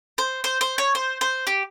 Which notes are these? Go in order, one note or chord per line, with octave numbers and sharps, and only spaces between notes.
C5
C5
C5
C#5
C5
C5
G4